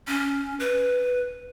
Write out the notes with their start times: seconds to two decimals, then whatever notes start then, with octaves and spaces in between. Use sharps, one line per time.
0.07 C#4
0.60 B4